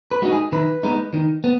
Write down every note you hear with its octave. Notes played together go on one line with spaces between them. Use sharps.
B4
G#3 D#4 F#4
G#4
D#3 B4
G#3 B3 D#4
D#3
B3